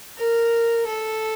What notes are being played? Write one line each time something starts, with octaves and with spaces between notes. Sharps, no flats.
A#4
A4